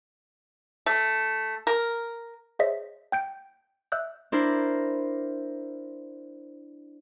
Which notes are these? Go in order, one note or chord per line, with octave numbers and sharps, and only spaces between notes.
A3
A#4
G#4 C5 C#5 D#5 E5 B6
G5 G6 D7
D#5 E5 E6 F#6 G6
D4 E4 A#4 C5